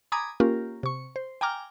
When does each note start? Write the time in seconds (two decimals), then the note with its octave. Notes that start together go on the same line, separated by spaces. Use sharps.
0.12 G#5 A#5 B5 D6 D#6 G#6
0.40 A#3 C#4 F4 G4 A#4
0.83 C3 C#6
1.16 C5
1.41 G5 G#5 A#5 D6 F6